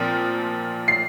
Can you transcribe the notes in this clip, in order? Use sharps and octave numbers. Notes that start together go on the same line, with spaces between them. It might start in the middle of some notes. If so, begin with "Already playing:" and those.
Already playing: A#2 F3 C4
C7